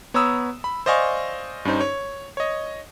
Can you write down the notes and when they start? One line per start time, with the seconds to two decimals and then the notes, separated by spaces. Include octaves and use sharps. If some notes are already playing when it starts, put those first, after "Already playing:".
0.14 B3 C#5 A#5 B5 D#6 E6
0.64 B5
0.86 C5 D5 D#5 F5 G#5 C#6
1.65 G2 C#4 D#4 C5
1.81 C#5
2.37 C#5 D#5